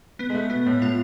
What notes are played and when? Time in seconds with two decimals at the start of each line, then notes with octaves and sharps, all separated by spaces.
0.19 B3
0.30 G#3
0.35 A3
0.50 B2 B3
0.66 A2
0.82 A2 F4